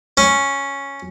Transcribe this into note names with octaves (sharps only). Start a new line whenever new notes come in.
C#4